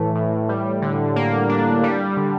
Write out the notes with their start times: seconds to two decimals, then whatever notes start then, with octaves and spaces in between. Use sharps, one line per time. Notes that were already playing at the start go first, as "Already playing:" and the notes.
Already playing: A2 E3 A3
0.15 A2
0.49 G3
0.82 D3
1.16 A#3
1.49 D4
1.83 G3
2.17 D3